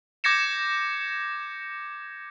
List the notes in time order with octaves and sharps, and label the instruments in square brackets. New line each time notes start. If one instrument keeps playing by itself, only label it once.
[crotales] D6 G6 G#6 A#6 C#7 E7